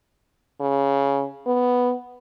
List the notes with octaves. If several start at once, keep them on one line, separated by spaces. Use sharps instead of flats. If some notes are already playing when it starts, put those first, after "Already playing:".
C#3
B3